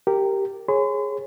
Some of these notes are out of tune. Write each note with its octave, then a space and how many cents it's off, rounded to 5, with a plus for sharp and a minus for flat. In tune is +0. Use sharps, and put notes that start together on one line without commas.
G4 +0 A#4 -15
G#4 +0 C#5 -25 C6 -45